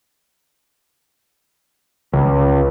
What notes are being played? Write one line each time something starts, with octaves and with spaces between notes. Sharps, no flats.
C#2